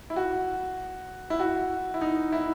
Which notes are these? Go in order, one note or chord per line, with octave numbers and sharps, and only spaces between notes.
E4
F#4
E4
F#4
E4
D#4
E4